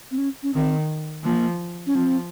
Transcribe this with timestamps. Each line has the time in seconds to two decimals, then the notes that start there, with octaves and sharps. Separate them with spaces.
0.11 C4
0.18 C#4
0.43 C#4
0.54 D#3 C4
1.24 F3 A#3
1.87 C#4
1.94 F3 C4